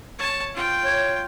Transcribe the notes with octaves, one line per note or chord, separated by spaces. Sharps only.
C#5 A5
F4 G5
C#5